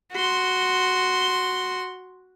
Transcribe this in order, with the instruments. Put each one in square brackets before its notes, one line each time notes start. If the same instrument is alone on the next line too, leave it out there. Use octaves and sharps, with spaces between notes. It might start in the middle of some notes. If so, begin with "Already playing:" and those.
[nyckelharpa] F#4 C6